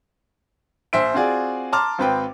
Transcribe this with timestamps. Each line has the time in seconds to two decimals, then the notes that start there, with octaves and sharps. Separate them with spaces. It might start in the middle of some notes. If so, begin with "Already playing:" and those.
0.93 A#1 C5 E5 D7
1.14 C4 F4 F#4 G#4 D5
1.73 A5 A#5 C6 D6 F6
1.98 G#1 C4 B4 G5